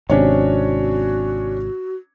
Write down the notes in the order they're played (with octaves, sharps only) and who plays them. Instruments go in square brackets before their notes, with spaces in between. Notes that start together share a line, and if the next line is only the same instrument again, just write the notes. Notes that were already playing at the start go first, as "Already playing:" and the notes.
[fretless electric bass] G#1 C3 [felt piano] C#4 D4 C#5 [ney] F#4